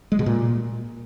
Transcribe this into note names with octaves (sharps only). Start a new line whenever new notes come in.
G#3
B2
A#2